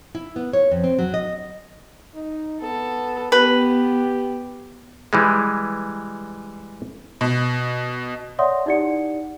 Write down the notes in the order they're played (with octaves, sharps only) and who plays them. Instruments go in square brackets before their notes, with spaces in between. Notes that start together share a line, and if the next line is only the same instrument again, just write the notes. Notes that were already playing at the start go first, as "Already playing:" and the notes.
[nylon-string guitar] E4
B3
C#5
F2
C4
F#3
D#5
[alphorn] D#4
[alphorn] B3 [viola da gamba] A4
[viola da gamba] B3 [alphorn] G4 [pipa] B4
[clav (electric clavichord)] E3 G3 G#3
[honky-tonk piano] B2
[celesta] C#5 D5 E5 F#5 C6 D#6
D#4 E4 G4 D5 F#5 C#7